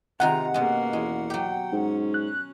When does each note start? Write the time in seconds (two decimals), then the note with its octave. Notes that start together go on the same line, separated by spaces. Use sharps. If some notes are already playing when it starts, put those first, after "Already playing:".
0.20 C3 D#3 G#3 F4 F#5 A#5
0.54 B2 G#3 A#3 C#4
0.93 E2 G#3
1.30 F#3 G4 G5
1.72 G#2 C#4
2.14 F#6